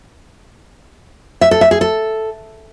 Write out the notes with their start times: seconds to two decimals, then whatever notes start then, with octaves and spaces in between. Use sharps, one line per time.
1.41 E5
1.51 A4
1.61 E5
1.71 G#4
1.81 A4